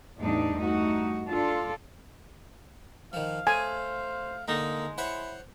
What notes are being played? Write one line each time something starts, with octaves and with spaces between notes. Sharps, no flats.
E2 A2 G3 D4 D#4
G2 A3 D#4 F#4
D4 F4 A4
D#3 F3 F5
A3 C5 G#5
D3 G#3 A#3 D#4
E4 C5 C#5 F#5